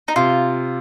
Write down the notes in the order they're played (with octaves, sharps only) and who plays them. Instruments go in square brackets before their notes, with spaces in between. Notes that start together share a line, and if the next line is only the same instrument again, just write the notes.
[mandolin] D#4
[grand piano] C3 [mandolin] F4